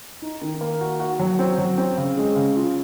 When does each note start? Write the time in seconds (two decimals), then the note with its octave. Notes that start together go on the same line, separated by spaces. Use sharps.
0.22 D#4
0.41 D#3
0.61 A#3
0.81 F#4
1.00 F#4
1.20 F#3
1.39 C4
1.58 F#3
1.78 C4
1.97 C#3
2.17 G#3
2.36 C#3
2.56 F4